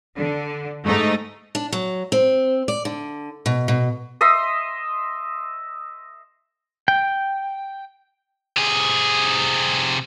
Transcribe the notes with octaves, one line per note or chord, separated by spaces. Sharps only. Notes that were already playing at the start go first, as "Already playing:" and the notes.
D3
G#2 A3 D#4
D4
F#3
C4
D5
D3
B2
B2
D#5 E5 C6 D#6
G5
C3 G#4